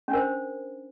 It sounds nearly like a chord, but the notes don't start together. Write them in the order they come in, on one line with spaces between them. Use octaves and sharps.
C#4 D4 A#4 C5